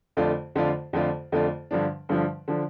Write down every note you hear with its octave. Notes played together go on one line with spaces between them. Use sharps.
F2 D3 A3 F4 D5
F2 D3 A3 F4 D5
F2 D3 A3 F4 D5
F2 D3 A3 F4 D5
G2 D3 F3 D4
G2 D3 F3 D4
D3 F3 D4